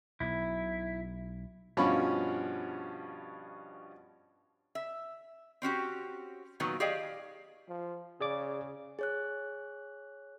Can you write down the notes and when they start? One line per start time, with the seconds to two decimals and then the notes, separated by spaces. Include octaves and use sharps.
0.20 B1 B2 E4
1.77 G2 B2 F3 C#4 B5 C#6
4.75 E5
5.62 C4 C#4 F#4 G4
6.60 A#2 D#3 F#3 B3
6.80 G4 G#4 D5 D#5 F5 G5
7.69 F3
8.21 C#3 G#4 D5 D6
8.99 G#4 C#5 F#6